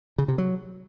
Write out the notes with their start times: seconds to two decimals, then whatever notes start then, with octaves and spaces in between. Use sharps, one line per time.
0.18 C#3
0.28 C3
0.38 F#3